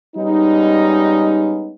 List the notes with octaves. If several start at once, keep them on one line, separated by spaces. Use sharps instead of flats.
G3 G#3 B3 C#4 D#4